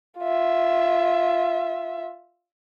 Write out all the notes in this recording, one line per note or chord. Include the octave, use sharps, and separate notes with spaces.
F4 E5